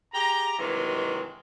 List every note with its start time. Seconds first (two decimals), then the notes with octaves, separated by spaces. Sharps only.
0.13 G4 G#4 G5 A#5
0.58 G2 C3 D#3 E3 F#3 G#3